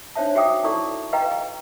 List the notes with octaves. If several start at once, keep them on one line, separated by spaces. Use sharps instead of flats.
D4 D#4 C5 C#5 E5 A5
F#4 G#4 E5 G5 D6 D#6
D#4 E4 A4 D5 C#6
B4 D#5 F5 G5 A#5
G#4